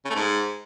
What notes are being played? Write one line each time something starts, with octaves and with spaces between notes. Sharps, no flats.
C#3
A3
G#2